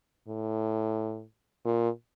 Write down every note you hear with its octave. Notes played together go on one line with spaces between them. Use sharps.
A2
A#2